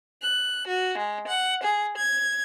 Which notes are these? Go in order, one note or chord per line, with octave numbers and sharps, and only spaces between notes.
F#6
F#4
G#3
F#5
G#4
G#6